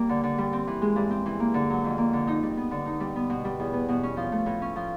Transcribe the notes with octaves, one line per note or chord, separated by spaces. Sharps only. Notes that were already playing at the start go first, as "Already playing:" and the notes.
Already playing: G3 A#3
D3
D3
G3
C4
E3
G#3
G2
C4
E3
A#3
D3
F#3
F2
A#3
D3
D#4
G3
B3
D3
D#4
G3
B3
B2
G3
E2
B3
B2
C#4
F3
A3
A2
C#4
F3